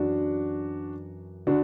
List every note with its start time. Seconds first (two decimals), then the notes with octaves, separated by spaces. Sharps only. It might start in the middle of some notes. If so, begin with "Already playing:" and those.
Already playing: F#2 E3 D4 F#4
1.47 D3 D4 F#4